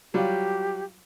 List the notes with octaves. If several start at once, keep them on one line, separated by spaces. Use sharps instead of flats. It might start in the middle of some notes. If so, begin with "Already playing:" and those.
F#3 G3 F4 G4